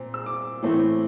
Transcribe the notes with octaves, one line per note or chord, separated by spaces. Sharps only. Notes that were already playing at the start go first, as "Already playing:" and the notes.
Already playing: A#2 C4
E6
D6
A2 E3 A3 C4